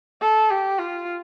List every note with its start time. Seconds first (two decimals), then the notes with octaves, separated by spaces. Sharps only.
0.21 A4
0.50 G4
0.79 F4